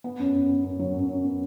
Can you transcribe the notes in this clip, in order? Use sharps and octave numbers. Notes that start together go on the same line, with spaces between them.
B3
F#2
F#2
B3
F#2
F#3
F#2
F#2
B3